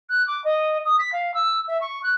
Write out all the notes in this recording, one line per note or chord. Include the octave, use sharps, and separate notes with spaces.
F#6
D6
D#5
D#6
B6
F5
E6
E5
C#6
F#6